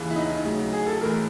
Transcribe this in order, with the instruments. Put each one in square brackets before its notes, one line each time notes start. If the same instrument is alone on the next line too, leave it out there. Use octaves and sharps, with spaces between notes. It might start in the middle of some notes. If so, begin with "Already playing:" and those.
Already playing: [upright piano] D#2 C#3 E3
E4
D#4
D2 C#3 F#3
G#4
A4
A2 E3 G#3 A#4